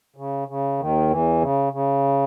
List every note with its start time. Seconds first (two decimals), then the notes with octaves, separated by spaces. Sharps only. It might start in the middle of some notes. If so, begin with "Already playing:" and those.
0.16 C#3
0.48 C#3
0.79 D#2 D#3
1.10 E2 E3
1.42 C#3
1.73 C#3